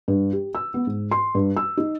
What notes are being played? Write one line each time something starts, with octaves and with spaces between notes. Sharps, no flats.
G2
G4
E6
B3
G#2
C6
G2
E6
D#4